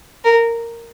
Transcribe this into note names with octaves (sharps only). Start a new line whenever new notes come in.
A#4